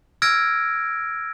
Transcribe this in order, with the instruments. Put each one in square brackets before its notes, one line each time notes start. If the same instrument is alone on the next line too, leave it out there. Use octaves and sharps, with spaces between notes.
[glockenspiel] E6 F6 G#6 A#6 D7